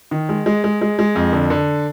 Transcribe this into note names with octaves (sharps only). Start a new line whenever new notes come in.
D#3
G#3
G#3
G#3
G#3
G#3
F2
D3
D3